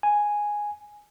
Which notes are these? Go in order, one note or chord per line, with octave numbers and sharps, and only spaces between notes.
G#5